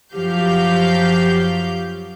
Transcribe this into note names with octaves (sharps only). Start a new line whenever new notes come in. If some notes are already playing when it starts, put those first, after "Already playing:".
F#2 F3 F#3 G4 F5 G6